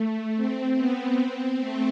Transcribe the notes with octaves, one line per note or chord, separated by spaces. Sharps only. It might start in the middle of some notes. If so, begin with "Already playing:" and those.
Already playing: A3
C4
B3
C4
A3